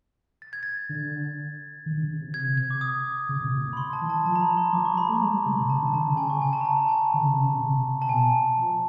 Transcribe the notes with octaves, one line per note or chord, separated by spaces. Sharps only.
A6
G#6
A6
D3
D#3
D3
C#3
C3
G#6
G#6
D6
D#6
C#3
C3
A#2
A2
B5
C6
A5
E3
A5
F3 A5
A#5
B5
C6
F3 D6
F3 C#6
G3 B5
A3 A#5
G#3
G3
C#3
C3
C#3 A5
D3
D3 A5
C#3
G#5
C#6
G#5
A5
A#5
A5
G#5
D3
C#3
C3
C#3
C3
A5
B2 G#5
F3